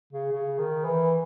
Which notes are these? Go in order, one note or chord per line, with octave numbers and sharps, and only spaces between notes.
C#3
C#3
D#3
E3